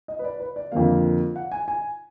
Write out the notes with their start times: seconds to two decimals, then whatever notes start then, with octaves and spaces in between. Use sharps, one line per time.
0.08 D#5
0.19 B4
0.24 D5
0.40 B4
0.56 D5
0.72 F2 D3 F3 A#3 F5
1.36 F#5
1.52 G#5
1.68 G#5